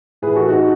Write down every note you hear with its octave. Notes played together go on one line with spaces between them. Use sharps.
A2 E3 G#4 B4
F#4 A4
D#4 F#4